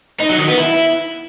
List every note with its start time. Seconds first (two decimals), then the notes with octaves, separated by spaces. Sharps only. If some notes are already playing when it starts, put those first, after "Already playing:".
0.20 D#4
0.29 F#3
0.39 D#3
0.48 B3
0.58 E4